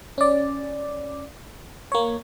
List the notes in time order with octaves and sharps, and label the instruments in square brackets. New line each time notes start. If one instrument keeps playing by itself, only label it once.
[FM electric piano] C#4 D5
A#3 C#5